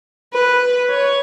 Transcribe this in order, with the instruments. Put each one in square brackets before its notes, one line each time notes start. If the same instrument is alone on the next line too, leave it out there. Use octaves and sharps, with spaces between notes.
[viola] B4
C#5